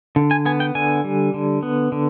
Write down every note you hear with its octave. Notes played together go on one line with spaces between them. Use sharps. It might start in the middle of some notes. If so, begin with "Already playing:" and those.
D3
G#5
B3 G#5
G5
D3 G#5
G3
D3
B3
D3